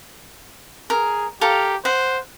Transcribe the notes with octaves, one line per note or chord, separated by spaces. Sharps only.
G#4 A#4
G4 A4 A#4 F5
C5 F#5